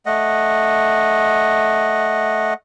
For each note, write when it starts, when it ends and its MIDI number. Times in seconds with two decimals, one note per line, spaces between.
0.06 2.54 57
0.06 2.54 75
0.06 2.54 78